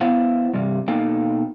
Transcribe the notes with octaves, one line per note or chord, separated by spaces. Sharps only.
B3 E4 C5 F5 F#5
G2 C3 G3
B2 A#3 D#4 A4 F5 G5